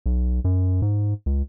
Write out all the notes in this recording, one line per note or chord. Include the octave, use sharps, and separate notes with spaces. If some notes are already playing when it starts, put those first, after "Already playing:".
B1
F#2
G#2
C#2